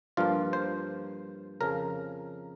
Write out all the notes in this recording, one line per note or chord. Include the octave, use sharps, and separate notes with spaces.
G2 F3 A#3 F4
C5
F2 C#3 F3 A#4